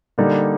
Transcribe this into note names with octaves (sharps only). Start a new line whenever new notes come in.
D3 G3 A#3 D#4